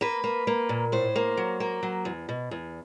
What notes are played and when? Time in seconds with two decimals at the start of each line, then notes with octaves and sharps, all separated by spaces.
0.01 A#3 B4
0.24 A#3
0.47 A#3
0.69 A#2
0.92 A2 C5
1.16 A#3
1.37 F#3
1.60 A#3
1.83 F#3
2.05 E2
2.29 B2
2.51 E2